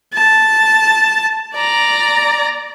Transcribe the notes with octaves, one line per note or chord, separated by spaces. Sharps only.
A5
D5 A#5